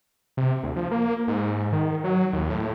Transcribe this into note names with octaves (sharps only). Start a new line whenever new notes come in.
C3
D2
F3
A#3
G#2
D#3
F#3
D#2
A2